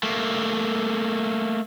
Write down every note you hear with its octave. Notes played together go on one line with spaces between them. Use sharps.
A3 A#3